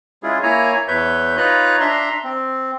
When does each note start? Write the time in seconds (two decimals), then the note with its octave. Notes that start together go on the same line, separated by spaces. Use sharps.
0.23 G#3 C#4 E4 F4 G#4
0.43 A#3 E4 C#5 G#5 A#5
0.88 E2 B4 C#5 E5 G6
1.37 D#4 F4 B4 C#5 A#5 F#6
1.80 D4 E5 A#5 C6
2.24 C4